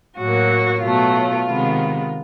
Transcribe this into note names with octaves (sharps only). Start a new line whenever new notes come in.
A2 F#3 A#3 F#4
B2 F#3 A3 F4
C3 D#3 G#3 B3